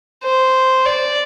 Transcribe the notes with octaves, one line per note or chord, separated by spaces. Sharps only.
C5
D5